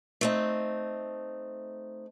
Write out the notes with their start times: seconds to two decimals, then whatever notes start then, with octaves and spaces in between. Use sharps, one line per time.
0.21 A3 C4 D#4